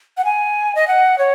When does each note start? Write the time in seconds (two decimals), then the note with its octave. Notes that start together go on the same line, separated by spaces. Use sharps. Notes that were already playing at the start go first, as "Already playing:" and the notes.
0.17 F#5
0.25 G#5
0.75 D#5
0.88 F#5
1.19 C#5